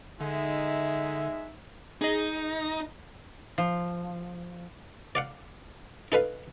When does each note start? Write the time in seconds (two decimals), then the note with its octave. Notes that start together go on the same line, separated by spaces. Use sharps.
0.21 D3 G#3 D#4 E5
2.01 D#4 G#4 D#5
3.58 F3
5.15 D5 F5 F#5
6.12 D#4 A4 B4 F5